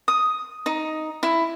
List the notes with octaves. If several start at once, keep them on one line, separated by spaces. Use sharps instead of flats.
D#6
D#4
E4